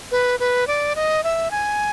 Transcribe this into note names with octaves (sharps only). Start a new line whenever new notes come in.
B4
B4
D5
D#5
E5
G#5